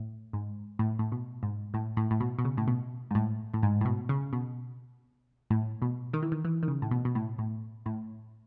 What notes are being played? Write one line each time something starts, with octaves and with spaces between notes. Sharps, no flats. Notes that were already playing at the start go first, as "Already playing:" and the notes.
Already playing: A2
G#2
A2
A2
B2
G#2
A2
A2
A2
B2
B2
C#3
A2
B2
G#2
A2
A2
G#2
A2
B2
C#3
B2
A2
B2
D#3
E3
D#3
E3
D#3
C#3
A2
B2
B2
A2
A2
A2